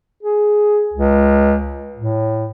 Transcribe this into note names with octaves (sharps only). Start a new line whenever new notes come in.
G#4
C#2
A2